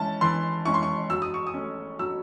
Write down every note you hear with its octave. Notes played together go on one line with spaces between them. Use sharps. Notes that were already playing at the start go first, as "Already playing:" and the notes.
Already playing: E3 G#3 C#4 E4 A5
E3 C6
G#3 C#4 E4 C#6
C6
C#6
F#3 E6
D#6
C#6
D#6
A3 C#4
F#3 E6